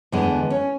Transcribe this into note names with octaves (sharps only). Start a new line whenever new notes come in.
E2 D3 G#3 B3
C#4